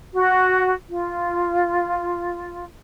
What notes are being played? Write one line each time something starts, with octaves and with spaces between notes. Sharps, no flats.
F#4
F4